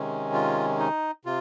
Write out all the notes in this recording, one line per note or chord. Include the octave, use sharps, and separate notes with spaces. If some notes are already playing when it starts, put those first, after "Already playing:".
Already playing: C3 D#3 G#3 C#4
F4
D#4
C3 F4